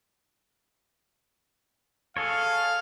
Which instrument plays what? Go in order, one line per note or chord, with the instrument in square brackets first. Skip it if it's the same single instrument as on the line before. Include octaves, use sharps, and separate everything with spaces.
[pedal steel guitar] G#4 A4 C#5 [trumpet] F5